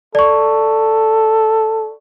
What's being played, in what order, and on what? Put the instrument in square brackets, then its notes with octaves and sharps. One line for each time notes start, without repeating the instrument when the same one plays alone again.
[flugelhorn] A4 [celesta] D5 C#6